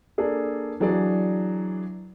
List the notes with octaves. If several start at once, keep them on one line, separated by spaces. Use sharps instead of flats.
A#3 D4 G#4 A4
E3 F#3 D4 G#4 D5